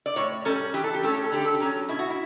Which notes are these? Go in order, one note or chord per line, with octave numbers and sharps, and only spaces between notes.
D5
A2 C#5
G3 C#4 A4
E3 G4
A4
G4
A3 C#4 A4
G4
A4
D3 G4
A4
G4
F#3 C#4
B2 E4
F#4
E4